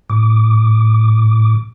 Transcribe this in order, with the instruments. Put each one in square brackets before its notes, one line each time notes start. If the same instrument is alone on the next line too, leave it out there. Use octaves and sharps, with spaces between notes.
[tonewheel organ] A2 D6